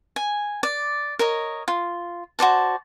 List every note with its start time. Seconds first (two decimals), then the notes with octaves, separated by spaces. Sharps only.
0.16 G#5
0.63 D5
1.19 A#4 C#5 D#5
1.68 F4
2.39 F#4 C5 D5 A5